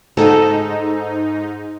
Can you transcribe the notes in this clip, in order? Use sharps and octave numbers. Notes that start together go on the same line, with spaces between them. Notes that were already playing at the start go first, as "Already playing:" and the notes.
G#2 D#4 A4